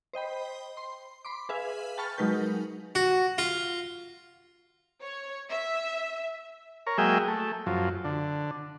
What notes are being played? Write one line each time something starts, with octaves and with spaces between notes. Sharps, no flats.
C5 D#5 G5 B5
C6
B5 C6 D6
G#4 B4 E5 F5 G#5
G5 A5 B5 C#6 F6 A6
F#3 G#3 D#4 A#4 B4 G6
F#4
F4
C#5
E5
A#4 C#5
F#3 G#3 A#3 G#4 E5 G5
A3
F#2 F3
D3